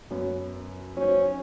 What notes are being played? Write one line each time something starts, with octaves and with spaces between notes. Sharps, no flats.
F#2 B3 C#4
F#3 C#4 D#4 C5